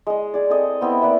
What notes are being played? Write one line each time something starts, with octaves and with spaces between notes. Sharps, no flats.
G#3 D#5
G#4 D5
C4 A4 D#5
B3 C4 E4 B4
A#3 B4 D5 E5